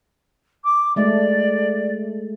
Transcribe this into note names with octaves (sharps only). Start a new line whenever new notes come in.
D6
G#3 A3 D5